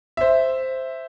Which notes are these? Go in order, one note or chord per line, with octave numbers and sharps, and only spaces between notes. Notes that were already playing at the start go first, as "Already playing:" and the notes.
C5 E5